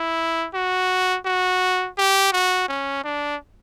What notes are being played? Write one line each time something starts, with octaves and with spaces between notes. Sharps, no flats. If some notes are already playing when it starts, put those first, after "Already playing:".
Already playing: E4
F#4
F#4
G4
F#4
C#4
D4